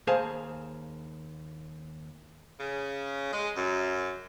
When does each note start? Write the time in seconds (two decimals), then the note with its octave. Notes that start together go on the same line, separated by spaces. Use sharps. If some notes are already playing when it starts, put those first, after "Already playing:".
0.07 D#2 G#4 C5 F5 G#5 A5
2.60 C#3
3.33 G#3
3.56 F#2